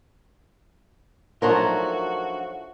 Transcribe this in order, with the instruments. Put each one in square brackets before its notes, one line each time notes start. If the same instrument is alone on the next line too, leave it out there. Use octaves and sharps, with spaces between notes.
[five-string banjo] F3 F#3 A3 [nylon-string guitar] D4 D#4 A#4 [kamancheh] F#4